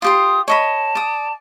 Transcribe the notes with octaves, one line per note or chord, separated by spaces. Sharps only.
F4 G4 C6 D#6
C#5 D#5 A5 B5
D5 D#6